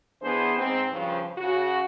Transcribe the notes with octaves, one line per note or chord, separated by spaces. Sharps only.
E3 B3 D4 G#4 C5
G#2 C4
G2 C#3 F3
C#3 F#4